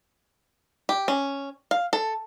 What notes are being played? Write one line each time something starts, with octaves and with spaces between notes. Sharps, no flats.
G4
C#4
F5
A4